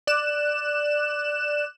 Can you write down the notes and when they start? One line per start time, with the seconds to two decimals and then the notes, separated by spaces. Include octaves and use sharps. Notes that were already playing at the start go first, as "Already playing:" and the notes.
0.07 D5 F#6 E7